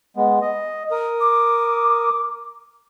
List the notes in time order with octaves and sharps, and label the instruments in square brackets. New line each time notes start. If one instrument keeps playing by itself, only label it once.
[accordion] G#3 B3
D#5
A#4 D#6
[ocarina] D6